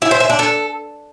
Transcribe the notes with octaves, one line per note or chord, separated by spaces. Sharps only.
E4
C5
E5
D4
A4